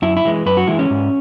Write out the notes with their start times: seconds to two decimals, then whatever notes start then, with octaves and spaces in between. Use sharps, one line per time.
0.02 F#2 E4
0.17 E4
0.25 E3 G#3
0.46 F#2 B4
0.57 F#4
0.67 E3 G#3 E4
0.79 C#4
0.90 G#2